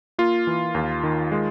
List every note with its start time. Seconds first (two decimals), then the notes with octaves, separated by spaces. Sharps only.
0.18 A#3 F4
0.47 E3
0.75 D#2
1.03 D#3
1.32 G#3